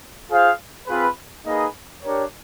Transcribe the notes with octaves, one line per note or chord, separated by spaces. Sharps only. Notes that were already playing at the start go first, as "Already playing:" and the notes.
F4 G#4 C5 F5
C4 F4 G#4 B4
A#3 D#4 G#4 B4 D#5
D4 G4 A#4 C#5